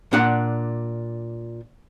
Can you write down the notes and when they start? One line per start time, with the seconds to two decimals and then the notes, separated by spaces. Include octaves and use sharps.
0.13 A#2 D4 F#5